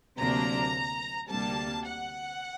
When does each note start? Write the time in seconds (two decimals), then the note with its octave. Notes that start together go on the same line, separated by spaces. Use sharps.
0.18 D2 C3 F#3 A#3 D4 A#5
1.30 D2 C3 G3 A#3 D4 A5
1.85 F#5